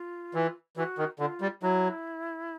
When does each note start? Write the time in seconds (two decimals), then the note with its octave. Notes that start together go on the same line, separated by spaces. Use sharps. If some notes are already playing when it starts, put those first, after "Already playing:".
Already playing: F4
0.34 E3
0.77 E3 F#4
0.98 D#3
1.19 D3 F4
1.41 G3
1.62 F#3 E4